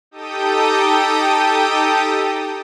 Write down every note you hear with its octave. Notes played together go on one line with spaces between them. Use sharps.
D#4 G4 A4 G5 D#6